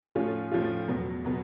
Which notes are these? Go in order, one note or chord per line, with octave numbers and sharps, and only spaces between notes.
A2 F3 A3 C#4 F4
A2 F3 A3 C#4 F4
E2 B2 F#3 B3
B2 F#3 B3